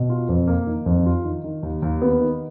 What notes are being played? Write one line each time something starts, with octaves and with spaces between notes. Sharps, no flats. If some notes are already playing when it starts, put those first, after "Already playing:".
Already playing: B2
F4
F2
A#3
D#3
F2
F4
D#3
D#3
D#2
D#2
B3
D#3